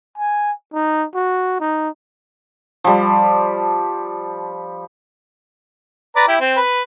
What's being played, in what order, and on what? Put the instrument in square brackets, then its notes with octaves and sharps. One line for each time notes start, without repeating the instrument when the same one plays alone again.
[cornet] G#5
D#4
F#4
D#4
[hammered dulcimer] F3 G3
[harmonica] B4 D5 A#5
E4 G4
C4
B4